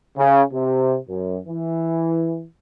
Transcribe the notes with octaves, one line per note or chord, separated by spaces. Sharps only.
C#3
C3
F#2
E3